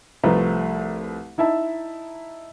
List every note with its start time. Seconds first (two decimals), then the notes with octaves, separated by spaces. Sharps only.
0.23 C2 F3 A3 B4 A#5
1.38 D#4 E4 E5 A5